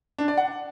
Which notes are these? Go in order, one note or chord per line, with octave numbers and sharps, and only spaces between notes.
D4
D5
F#5